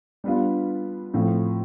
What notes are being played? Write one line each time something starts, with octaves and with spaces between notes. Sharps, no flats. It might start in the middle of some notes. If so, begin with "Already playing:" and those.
G3 B3 D4 F4
A2 F3 C4